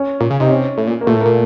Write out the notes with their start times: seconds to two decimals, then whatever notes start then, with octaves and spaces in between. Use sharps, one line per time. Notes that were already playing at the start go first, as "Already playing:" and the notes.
Already playing: C#4
0.20 A#2
0.30 C#3
0.40 C3 D#4
0.50 C#4
0.78 A2
0.87 A#2
1.01 A#3
1.07 A#2 A3
1.15 A2
1.21 A#2 A#3